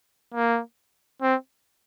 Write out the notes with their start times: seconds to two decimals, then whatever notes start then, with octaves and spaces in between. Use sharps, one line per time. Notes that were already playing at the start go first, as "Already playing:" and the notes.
0.34 A#3
1.22 C4